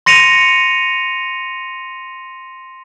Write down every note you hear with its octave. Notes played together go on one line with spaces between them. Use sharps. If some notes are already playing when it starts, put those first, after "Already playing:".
C6 A#6 C#7 D#7 F7